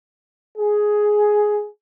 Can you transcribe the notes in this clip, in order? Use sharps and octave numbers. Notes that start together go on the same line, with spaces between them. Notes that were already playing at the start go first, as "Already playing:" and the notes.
G#4